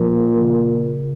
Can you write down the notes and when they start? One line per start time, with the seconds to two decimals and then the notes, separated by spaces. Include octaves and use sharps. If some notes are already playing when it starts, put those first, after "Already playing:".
Already playing: A#2 F3
0.41 C#3